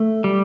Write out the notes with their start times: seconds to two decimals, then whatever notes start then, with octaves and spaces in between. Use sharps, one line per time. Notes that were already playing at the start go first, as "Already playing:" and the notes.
Already playing: A3
0.24 G3